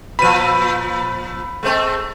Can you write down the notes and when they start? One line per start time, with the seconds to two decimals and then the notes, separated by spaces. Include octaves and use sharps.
0.19 A#2 F3 B5 D#7
1.63 G#3 A3 C4